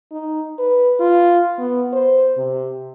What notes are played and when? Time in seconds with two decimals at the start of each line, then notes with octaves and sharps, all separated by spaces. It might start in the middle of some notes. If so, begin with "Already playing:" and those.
0.11 D#4
0.59 B4
1.00 F4
1.58 B3
1.93 C5
2.37 C3